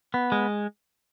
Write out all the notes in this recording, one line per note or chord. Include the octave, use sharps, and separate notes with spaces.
B3
G#3